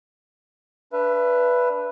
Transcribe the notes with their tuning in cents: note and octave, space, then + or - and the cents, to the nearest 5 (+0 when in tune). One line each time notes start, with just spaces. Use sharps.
D4 +0 B4 +0 E5 +30